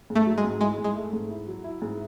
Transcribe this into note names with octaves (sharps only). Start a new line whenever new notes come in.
G#2
A3
F#3
G#3
G#2
G#3 E4
G#2
G#3
A3
G#2
E4
F#3
E4
G#2